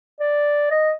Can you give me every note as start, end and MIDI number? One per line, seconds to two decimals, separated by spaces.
0.20 0.70 74
0.71 0.93 75